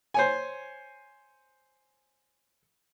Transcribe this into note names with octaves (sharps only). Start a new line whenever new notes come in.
C5 C#5 G#5